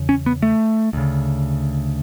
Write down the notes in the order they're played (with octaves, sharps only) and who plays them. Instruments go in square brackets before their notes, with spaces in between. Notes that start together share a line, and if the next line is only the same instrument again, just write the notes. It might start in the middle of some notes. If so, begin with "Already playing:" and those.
Already playing: [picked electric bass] E2 C#3
C#4
B3
A3
D2 C#3